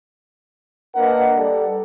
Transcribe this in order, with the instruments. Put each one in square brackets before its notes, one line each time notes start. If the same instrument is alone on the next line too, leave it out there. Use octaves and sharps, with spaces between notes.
[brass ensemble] A#3 D4 A#4 B4 D#5 F#5
G3 A4 D5